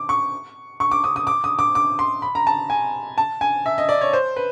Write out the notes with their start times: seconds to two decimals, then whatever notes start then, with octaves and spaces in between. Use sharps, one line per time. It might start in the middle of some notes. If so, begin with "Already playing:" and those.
Already playing: D6
0.09 C#6
0.80 C#6
0.91 D6
1.04 D#6
1.16 D#6
1.27 D6
1.44 D#6
1.59 D6
1.75 D6
1.99 C6
2.22 B5
2.35 A#5
2.47 A5
2.70 G#5
3.18 A5
3.41 G#5
3.66 E5
3.78 D#5
3.89 D5
4.01 C#5
4.13 C5
4.36 B4